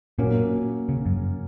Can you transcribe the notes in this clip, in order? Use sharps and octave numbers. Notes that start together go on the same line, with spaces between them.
A#2 F#3 A#3 C#4
C#3
F#2